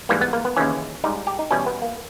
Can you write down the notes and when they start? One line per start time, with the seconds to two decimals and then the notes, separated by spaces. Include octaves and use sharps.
0.09 G#2 E3 G3 A#3
0.21 B3
0.33 A#3
0.45 B3
0.56 D#2 C#3 E3 C#4
1.04 G#2 G3 D#4
1.27 G4
1.39 D#4
1.51 E2 B2 G3 C#4
1.66 B3
1.82 A#3